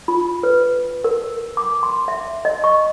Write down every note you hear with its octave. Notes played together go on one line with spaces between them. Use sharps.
F4
B4
A#4
D6
C6
E5
D#5
C#6